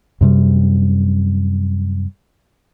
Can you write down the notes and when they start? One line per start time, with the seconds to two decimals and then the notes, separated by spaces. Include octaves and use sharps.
0.21 F#2 C3 G3